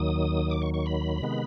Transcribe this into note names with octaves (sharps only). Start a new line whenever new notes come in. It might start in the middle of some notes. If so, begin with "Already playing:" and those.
Already playing: D#2 D#3 F#3 D#6
D6
C#6
C#6
B5
C3 D#3 G#3 B3